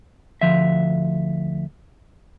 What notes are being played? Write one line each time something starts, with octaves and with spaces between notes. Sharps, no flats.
D2 F3 E5